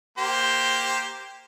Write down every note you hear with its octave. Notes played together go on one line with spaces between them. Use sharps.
A#3 G4 C5